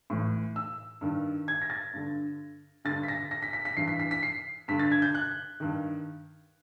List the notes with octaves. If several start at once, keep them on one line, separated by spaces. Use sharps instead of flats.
A2 E3
E6
G2 D#3
G#6
A#6
A6
G2 D3
G2 D3 A6
B6
A#6
A#6
B6
B6
B6
G2 E3 C7
B6
B6
B6
C7
G2 D3 B6
A6
G#6
G6
F#6
G2 D#3